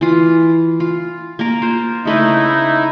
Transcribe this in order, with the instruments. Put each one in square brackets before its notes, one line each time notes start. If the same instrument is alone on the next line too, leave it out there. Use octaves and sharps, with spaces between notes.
[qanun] E3 F4
F4
A#3 A#4
F4 C5
[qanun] C#3 A3 B4 [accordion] D#4 E4